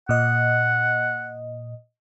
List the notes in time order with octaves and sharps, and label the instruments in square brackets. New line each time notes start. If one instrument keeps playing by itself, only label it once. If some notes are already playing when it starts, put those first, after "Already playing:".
[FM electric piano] A#2 D#5 [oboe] F#5